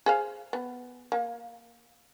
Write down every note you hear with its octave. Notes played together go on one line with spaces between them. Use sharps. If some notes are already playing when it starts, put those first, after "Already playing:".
G#4 C5 F5
B3
A#3